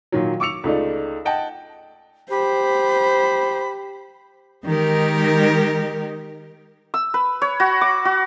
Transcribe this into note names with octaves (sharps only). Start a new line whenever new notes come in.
A#2 D#3 F#3
C#6 D6 E6 C#7 F7
C#2 A3 D#4 D5
D#5 F#5 G5 A5
G4 C5 B5
D#3 G#3 D#4 G4 A#4
E6
B4
C#5
F#4
D6
F#4